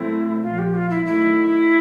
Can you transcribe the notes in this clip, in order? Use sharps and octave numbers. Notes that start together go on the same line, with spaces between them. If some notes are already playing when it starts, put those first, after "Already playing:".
Already playing: A#2 F#3 A3 C4 E4
A#1 A#2 F3 F4
G4
F4
E4
D#3 F#3 A3 E4